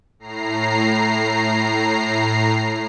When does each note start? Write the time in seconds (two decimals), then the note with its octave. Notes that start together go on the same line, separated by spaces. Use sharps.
0.19 A2 A#5 C7